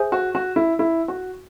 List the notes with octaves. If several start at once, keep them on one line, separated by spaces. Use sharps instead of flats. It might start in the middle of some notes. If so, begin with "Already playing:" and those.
Already playing: G#4 C5 E5 G#5
F#4
F#4
E4
E4
F#4